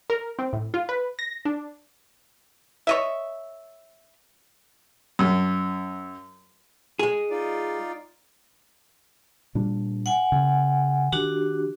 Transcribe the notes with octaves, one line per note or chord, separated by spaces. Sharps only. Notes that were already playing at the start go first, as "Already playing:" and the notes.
A#4
C4
A2
F4
B4
A#6
D4
C#5 D#5 E5
F#2
G#3 G#4
D#4 F4 D5
A#2 G3 D4
F#5 G#5
C#3
D#3 D4 F#4 G4